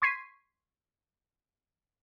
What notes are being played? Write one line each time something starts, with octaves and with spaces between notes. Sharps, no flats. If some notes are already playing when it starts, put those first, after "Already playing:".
C6 C#6 G#6 B6 C7 D#7